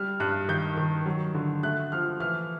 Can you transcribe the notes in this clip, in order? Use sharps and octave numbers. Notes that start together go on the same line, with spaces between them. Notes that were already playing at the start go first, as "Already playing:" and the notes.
Already playing: G3 F6
G2 F#6
D#3 G6
D#3
F#3
D3
A3 F#6
F3 F6
E3 F6